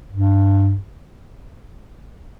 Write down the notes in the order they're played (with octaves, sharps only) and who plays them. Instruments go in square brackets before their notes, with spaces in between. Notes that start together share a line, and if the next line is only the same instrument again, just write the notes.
[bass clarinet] G2